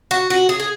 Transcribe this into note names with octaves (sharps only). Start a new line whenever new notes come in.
F#4
F#4
G#4
G#4